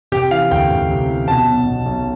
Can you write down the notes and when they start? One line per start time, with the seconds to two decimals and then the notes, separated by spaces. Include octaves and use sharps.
0.12 C3 G4
0.31 E3 F5
0.51 D2 G5
0.71 D2
0.90 C3
1.09 E3
1.27 B2 A5
1.47 B1
1.66 B2
1.86 B1